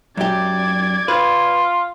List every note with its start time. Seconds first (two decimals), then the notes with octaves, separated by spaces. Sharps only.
0.17 F#2 G4 D5 G#6
1.08 F4 B4